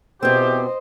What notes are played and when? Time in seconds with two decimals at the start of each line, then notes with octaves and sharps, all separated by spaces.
0.23 E2 B2 E3 C4 G4 C5 D#5